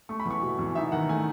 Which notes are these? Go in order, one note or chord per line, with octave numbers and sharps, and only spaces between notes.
A3 C#6
B5
E2
C#6
B2
E2
D#4 E5
D#3 F#5
A3 G#5